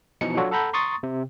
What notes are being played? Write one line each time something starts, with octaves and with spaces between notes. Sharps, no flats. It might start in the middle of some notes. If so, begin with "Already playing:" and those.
B2 E3 F3 D#4 C#7
F#3 D4 F4 F#4 A4 C#5
A4 F#5 A#5 B5 G6
A#5 C6 C#6 D#6 A6
C3